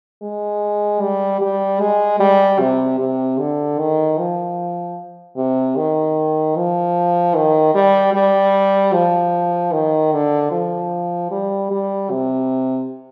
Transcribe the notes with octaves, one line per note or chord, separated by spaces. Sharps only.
G#3
G3
G3
G#3
G3
C3
C3
D3
D#3
F3
C3
D#3
F3
D#3
G3
G3
F3
D#3
D3
F3
G3
G3
C3